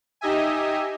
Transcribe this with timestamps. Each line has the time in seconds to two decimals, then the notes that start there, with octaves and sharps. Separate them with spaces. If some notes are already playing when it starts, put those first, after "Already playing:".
0.21 D#4 G4 D#5 E5 G#5